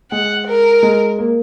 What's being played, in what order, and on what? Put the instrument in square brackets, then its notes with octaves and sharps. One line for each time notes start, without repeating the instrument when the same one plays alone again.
[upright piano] G#3 [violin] F#5
[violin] A#4
[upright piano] G#3
A#3